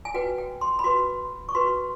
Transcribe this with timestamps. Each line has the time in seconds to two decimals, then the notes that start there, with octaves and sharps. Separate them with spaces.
0.05 G#5
0.14 F#4 B4 G5
0.38 G5
0.61 C6
0.79 B5
0.84 F#4 B4 C6
1.49 C#6
1.55 F#4 B4 C6